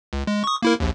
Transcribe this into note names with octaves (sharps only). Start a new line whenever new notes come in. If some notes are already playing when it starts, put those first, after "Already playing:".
C#2
G#3
C#6 D#6
A#3 E4 A#4
A#1 D#2